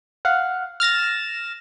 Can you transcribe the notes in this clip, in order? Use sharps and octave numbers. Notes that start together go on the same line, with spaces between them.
F5 F#5
F6 A6 A#6 E7